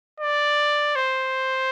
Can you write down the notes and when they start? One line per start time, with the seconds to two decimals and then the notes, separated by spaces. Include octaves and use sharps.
0.20 D5
0.96 C5